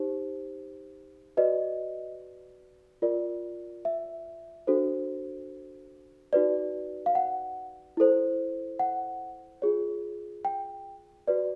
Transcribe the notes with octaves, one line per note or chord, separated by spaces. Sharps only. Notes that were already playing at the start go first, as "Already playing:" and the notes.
Already playing: D#4 G4 C5
F#4 B4 D5 D#5
F4 A#4 D5
E5
D4 F#4 A4 C5
D#4 F#4 B4 D5
F5
F#5
E4 A4 C5
F#5
F4 G#4 C#5
G5
F#4 B4 D5